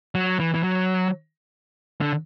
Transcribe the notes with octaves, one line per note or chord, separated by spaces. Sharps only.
F#3
E3
E3
F#3
D3